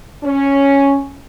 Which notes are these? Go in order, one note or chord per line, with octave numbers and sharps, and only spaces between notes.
C#4